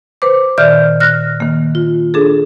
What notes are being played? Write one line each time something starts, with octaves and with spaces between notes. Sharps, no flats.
B4 C5 D6
A#2 D#3 D5 E5 F6 G6
F6 F#6 A#6
D#3 A#3
F4
D4 G#4 A4